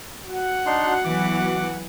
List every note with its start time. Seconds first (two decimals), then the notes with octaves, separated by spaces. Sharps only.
0.24 F#4 F#5
0.66 D4 D#4 C6
1.05 E3 F#3 B3 D6